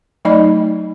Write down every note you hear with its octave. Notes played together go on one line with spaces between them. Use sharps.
F#3 A3 D#4 D5 D#5 B5